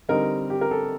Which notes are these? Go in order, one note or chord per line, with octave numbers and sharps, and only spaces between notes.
D3 G3 C4 D#4 A#4
G4
A#4
A4